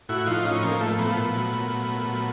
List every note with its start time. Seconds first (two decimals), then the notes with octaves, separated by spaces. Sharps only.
0.09 A2 E4 F#4
0.26 F3 D#4 F4
0.45 A2 C#4 D#4
0.63 F3 A#3
0.80 A2 A3
0.98 F3 A3 B3
1.16 A#2
1.34 F#3
1.52 A#2
1.70 F#3
1.88 A#2
2.06 F#3